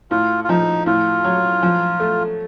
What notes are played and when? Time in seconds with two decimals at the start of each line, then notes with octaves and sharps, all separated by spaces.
0.11 A2 F4
0.44 F4
0.49 F3 D#4
0.86 A2 F4
1.24 F#3
1.63 F3
2.00 A3